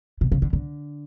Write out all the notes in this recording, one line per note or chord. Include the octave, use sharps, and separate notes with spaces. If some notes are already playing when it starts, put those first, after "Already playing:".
B2
C#3
D3
D3